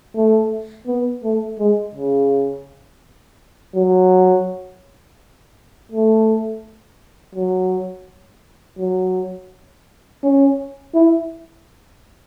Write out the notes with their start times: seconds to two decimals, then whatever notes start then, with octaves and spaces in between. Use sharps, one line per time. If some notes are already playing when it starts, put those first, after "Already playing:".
0.16 A3
0.87 B3
1.24 A3
1.60 G#3
1.95 C#3
3.76 F#3
5.92 A3
7.35 F#3
8.79 F#3
10.23 C#4
10.95 E4